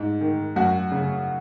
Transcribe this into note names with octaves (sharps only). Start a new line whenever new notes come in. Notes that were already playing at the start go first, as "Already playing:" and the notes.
Already playing: G#2
D#3
F#2 F#4
C#3